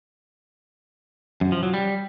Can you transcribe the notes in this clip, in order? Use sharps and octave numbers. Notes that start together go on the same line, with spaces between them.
F#2
F3
F#3
G3